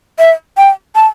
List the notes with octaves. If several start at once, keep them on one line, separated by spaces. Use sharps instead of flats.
E5
G5
A5